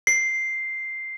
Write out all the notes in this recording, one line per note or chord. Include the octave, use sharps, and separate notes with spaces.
C7